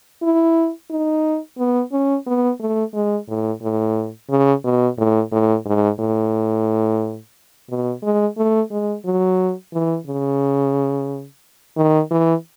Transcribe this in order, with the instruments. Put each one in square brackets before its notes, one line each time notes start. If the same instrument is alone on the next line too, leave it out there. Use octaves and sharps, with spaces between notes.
[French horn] E4
D#4
B3
C#4
B3
A3
G#3
A2
A2
C#3
B2
A2
A2
G#2
A2
B2
G#3
A3
G#3
F#3
E3
C#3
D#3
E3